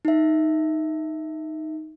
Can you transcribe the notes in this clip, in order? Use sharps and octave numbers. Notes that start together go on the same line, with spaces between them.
D#4 E5